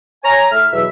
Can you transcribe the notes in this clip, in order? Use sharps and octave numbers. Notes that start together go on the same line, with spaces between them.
C#5 G#5 A#5
A2 E5 F6
E2 B2 F#3 E5